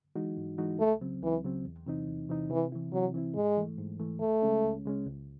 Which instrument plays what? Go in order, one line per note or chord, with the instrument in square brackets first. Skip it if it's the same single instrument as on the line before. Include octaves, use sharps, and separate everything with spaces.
[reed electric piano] E3 G#3 D#4 F#4
G#2
E3 G#3 D#4 F#4
[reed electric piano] C#2 [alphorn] A3
[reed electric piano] C#3 F#3 C4
[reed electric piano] C#2 [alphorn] E3
[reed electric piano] C#3 F#3 C4
E2
C3 E3 C4 D#4
E2
C3 E3 C4 D#4
[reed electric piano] C3 [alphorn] E3
[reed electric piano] E3 C4 E4
[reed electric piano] C3 [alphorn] F#3
[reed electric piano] E3 C4 E4
[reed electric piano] G#2 [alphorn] G#3
[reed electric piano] E3 A3
G#2
E3 A3
[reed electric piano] C#2 [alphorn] A3
[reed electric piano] C#3 G#3 C#4
C#2
C#3 G#3 C#4
C#2